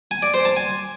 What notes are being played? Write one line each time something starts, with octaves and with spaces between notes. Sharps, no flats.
G#5
D5
C5
A5
G#5